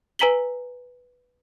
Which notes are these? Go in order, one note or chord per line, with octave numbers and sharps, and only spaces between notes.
B4 G#5 A#5 B6 F#7 G7